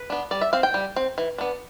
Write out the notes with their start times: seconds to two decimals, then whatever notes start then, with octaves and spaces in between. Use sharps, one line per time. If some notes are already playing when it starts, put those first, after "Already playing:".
Already playing: B4
0.10 B3 D4
0.31 G3 D5
0.41 E5
0.53 C4 F5
0.63 G5
0.74 G3
0.96 C4
1.18 E3
1.38 B3 D4